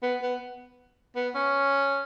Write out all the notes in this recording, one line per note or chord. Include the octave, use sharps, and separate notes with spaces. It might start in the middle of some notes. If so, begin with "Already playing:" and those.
B3
B3
B3
C#4